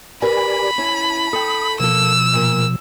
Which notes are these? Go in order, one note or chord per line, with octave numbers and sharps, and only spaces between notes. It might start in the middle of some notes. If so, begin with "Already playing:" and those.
G4 A#4 B4 D5 G#5 B5
C#4 E4 A5
A4 G5 D#6
B2 F3 A#3 A4 E6
A#2 A#4